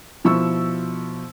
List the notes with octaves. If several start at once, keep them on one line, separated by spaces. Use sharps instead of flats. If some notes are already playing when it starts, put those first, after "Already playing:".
B2 F3 E4 C#6 E6